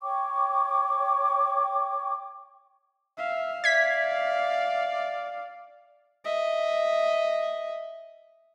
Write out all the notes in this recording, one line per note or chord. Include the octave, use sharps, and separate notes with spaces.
C#5 G5 C#6 D6
E5 F5
D5 E5 G#6 B6
D#5 E5